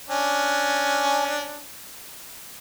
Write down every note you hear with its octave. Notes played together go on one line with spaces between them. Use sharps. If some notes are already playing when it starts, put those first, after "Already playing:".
C#4 D4